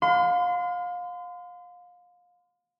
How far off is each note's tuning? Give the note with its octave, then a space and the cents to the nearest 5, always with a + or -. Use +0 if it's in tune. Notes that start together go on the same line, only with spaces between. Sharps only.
F5 +30 C6 -35